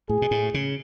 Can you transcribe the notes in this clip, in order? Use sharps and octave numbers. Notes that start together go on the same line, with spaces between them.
A2 G#4
B2
A2
C#3